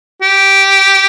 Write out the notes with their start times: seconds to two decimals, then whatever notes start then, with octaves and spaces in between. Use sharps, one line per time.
0.22 G4